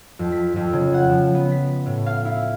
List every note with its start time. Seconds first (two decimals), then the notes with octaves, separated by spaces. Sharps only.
0.19 F2
0.32 B6
0.56 F2
0.73 C#3
0.94 F#5
1.09 F3
1.34 B3
1.52 B6
1.86 A2
2.06 F5
2.25 E4